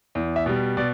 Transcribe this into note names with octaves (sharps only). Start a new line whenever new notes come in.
E2
E5
B2 G3
B2 D5